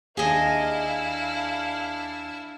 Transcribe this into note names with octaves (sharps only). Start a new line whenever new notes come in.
D#2 D4 E4 G#4 D#5 F5 G#5 E6